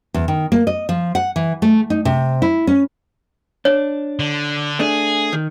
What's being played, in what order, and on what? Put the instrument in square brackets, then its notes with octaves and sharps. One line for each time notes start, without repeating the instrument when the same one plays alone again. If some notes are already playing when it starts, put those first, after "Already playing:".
[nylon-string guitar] E2
D#3
A#3
D#5
F3
F#5
E3
A3
D#4
C3
E4
C#4
[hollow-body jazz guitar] D4 [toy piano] C#5
[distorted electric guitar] D3
[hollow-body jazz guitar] A3 D4 [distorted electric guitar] G#4
[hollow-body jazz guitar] D#3